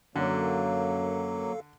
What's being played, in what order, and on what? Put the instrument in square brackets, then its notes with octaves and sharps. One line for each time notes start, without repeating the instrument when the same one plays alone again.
[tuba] F#2 [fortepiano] D3 [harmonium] F#3 A#3 [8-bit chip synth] A4 F5